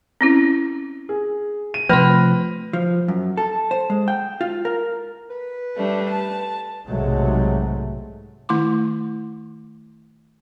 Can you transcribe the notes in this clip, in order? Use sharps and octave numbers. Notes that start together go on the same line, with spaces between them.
C4 C#4 E4
G#4
D#7
C3 F3 A3 B4 C6 F6 A#6
F3
F#2
A4
C5
G#3
G5
F4
A#4
B4
G3 A3 D4
A5
B1 G#2 C3 F#3 G#3 A3
D#3 A3 E4 C6 D6